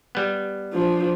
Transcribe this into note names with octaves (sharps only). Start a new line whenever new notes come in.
G3 B3
F3 D4